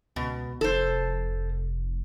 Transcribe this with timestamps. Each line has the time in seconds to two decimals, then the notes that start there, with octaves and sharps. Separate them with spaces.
0.16 C#2 B2
0.61 F1 A4 C5